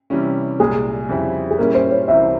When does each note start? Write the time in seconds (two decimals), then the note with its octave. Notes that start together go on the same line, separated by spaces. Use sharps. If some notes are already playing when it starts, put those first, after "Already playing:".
0.10 C3 E3 G3 C#4
0.60 C2 A#2 G#3 G#4
1.09 F2 C#3 G3 C4 E4
1.51 G#4
1.58 A#2 G3 C#4 E4 A#4
1.75 C5
1.91 C#5
2.08 C2 C3 E3 E5